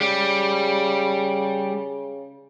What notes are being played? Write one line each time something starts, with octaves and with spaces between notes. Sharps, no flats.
C#3 G3